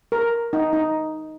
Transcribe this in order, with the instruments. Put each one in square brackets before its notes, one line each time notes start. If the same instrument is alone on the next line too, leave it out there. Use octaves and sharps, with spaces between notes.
[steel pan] A#4
D#4
D#4